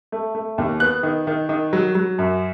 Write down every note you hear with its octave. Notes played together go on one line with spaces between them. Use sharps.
A3
A3
D#2
B3 F#6
D#3
D#3
D#3
F#3
F#3
F#2